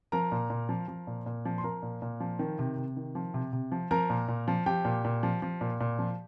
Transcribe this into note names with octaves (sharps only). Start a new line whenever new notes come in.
F3 A#4 A#5
A#2
A#2
F3
F3
A#2
A#2
F3
C6
F3 A#4 A#5
A#2
A#2
F3
D#3
C3
C3
D#3
F3
C3
C3
F3
F3 A#4 A#5
A#2
A#2
F3
F3 G4 G5
A#2
A#2
F3
F3
A#2
A#2
F3